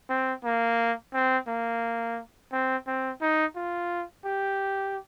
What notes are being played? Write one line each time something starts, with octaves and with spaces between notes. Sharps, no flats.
C4
A#3
C4
A#3
C4
C4
D#4
F4
G4